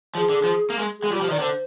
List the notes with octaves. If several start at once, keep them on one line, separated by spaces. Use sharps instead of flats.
F3 G#4
D3
F3
A#3
G#3
G#4
G#3
F4
G3
G4
F3
D#3 D5
D3 C5